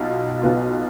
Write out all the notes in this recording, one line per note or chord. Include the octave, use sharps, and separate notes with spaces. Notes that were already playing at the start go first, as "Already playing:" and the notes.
Already playing: B1 B2 F4
B1 B2 B3 F4